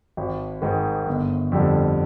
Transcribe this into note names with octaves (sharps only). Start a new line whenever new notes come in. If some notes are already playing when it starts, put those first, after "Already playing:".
G#1
G#2 D#3 G#3
G1
F2 D3 G3